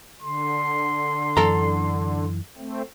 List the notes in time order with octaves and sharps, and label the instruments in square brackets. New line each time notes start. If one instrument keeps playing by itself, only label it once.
[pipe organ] D3 [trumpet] C6
[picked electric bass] F#2 E3 [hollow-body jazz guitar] A4 A#5
[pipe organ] A3 C4